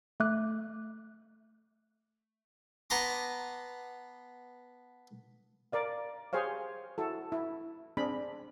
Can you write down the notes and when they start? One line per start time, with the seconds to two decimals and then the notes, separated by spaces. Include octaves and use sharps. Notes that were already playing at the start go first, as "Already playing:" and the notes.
0.20 A3 E5 D6 F#6
2.90 B3 A5 A#5 C6 D6
5.72 A#4 D5 F5
6.33 G4 G#4 C5 C#5 F5
6.98 E4 F#4 A4
7.32 E4
7.97 C4 D4 G#4 B5